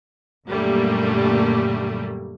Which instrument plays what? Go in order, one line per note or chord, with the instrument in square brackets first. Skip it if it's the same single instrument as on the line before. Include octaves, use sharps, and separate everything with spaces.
[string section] F#2 A#2 D3 G3 A3 A#3